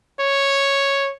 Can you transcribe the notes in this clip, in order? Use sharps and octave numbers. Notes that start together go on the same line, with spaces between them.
C#5